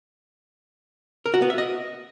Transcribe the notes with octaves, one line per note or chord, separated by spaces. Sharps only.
A#4
F#4
B3
E5
D#5